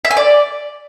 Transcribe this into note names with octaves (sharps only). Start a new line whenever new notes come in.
E5
G#5
D5